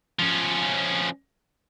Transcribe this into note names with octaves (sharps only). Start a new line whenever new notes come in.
F3 C#4